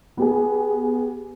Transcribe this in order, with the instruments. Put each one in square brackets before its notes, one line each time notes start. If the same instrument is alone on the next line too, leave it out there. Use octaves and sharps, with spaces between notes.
[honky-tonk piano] B3 G4 G#4